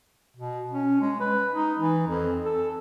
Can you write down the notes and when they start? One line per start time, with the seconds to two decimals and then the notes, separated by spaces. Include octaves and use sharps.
0.37 B2
0.71 C#4
1.01 G#3
1.20 B4
1.52 D#4
1.78 E3
2.08 F2
2.45 A4